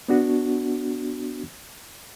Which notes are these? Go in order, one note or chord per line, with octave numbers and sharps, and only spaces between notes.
B3 D4 F#4